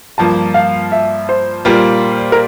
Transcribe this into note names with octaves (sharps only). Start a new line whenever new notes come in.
G2 F3 A#3 A5
F5
E5
C5
A#2 G3 A#3 F4
A#4